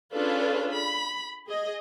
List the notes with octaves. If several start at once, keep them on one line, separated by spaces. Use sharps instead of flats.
C#4 D4 F4 G#4 A4 B4
B5
G#4 D#5